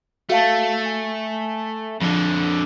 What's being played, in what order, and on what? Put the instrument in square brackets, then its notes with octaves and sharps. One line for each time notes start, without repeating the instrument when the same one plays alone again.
[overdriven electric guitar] A3 [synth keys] F#4 F5 A5
[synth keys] G#5
[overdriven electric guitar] F2 D3 [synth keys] F3